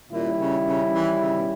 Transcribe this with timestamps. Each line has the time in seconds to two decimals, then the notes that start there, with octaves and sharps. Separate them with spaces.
0.11 A#2 D#3 G3 C#4 E4
0.38 C#3
0.65 C#3
0.92 E3
1.19 C#3
1.37 B2